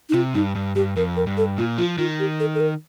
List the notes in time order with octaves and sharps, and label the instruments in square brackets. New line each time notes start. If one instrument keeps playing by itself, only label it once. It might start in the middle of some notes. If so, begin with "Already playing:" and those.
[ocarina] D#4
[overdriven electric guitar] C3 [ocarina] F4
[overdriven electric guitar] G2 [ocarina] D#4
[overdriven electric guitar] G2
[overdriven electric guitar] G2 [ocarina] G4
[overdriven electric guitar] F2 [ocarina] A#4
[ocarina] A#4
[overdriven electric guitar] G2
[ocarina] A4
[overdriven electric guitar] A#2 [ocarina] F4
[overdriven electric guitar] F3 [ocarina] F4
[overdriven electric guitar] D#3 [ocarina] F4
[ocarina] G4
A4
A4
A#4